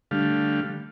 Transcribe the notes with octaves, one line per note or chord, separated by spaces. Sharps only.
D3 G3 A3 F5